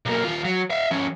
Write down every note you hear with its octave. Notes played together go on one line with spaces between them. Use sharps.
B1 A#3
D#2 F4
F#3
E5 F5
F3 C#4